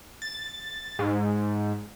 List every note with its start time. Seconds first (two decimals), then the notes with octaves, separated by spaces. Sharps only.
0.22 A6
0.99 G#2